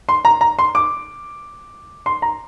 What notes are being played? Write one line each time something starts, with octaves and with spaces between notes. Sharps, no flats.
C6
A#5
A#5
C6
D6
C6
A#5